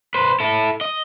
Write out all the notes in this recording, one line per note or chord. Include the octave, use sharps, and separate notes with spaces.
B4 C5
E4 A4
D#5